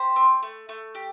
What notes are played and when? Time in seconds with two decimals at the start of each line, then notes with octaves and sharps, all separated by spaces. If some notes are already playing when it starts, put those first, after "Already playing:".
Already playing: G4 C5
0.16 C4
0.42 A3
0.69 A3
0.95 G4